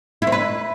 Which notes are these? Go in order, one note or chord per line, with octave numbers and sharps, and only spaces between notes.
E4
C4
B4